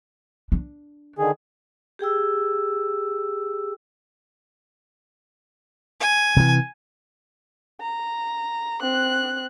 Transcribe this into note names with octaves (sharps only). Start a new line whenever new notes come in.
D4
D3 D#3 G#4
G4 G#4 G5 E6
G#5
C3 E3
A#5
C4 F#6